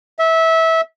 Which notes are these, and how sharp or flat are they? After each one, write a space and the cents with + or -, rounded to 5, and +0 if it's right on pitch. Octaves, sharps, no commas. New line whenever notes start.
E5 -20